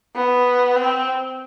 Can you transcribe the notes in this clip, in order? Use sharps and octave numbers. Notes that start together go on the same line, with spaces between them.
B3
C4